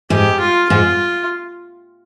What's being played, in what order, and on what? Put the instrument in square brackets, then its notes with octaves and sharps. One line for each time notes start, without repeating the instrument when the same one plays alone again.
[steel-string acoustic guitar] G#2 [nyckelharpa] G4
[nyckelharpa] F4
[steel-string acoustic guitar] G#2 [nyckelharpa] F4